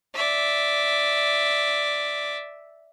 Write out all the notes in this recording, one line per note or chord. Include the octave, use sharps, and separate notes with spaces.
D5 E5